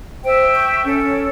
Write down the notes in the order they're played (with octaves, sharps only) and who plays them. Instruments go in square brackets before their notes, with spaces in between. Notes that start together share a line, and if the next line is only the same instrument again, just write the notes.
[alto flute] C5 [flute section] E5 G5
[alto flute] C#6
[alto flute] C#4 [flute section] A4